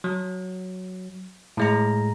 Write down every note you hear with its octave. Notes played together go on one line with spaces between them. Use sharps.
F#3
A2 G#3 A#5